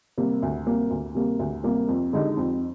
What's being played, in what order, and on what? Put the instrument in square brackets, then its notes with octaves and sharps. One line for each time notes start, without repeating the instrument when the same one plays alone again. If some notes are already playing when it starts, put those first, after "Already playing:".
[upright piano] C3 G3 A#3
D2
C3 G3 A#3
D2
C3 G3 A#3
D2
C3 G3 A#3
F2
D3 G#3 D#4 G4
F2